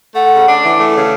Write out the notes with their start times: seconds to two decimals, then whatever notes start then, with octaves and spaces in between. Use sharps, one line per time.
0.15 A3 F#5
0.31 C#3
0.47 D4
0.62 E3
0.78 A3
0.93 C#3